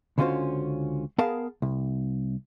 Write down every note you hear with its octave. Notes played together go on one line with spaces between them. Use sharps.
C#2 D3 C#4 F4 F#4 C5
B3 G#4 A#4 F5 A5
C2